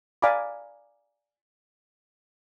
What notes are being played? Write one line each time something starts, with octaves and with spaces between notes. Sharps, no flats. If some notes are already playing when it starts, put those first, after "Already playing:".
D5 F5 G#5 A#5 B5 D6